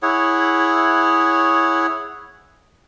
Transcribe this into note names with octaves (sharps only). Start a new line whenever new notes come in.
E4 G#4 C#5 F#5